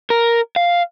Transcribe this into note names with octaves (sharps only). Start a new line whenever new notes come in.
A#4
F5